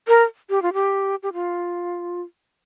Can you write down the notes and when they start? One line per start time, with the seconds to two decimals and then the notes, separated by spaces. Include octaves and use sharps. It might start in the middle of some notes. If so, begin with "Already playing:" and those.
0.08 A#4
0.50 G4
0.62 F4
0.74 G4
1.23 G4
1.33 F4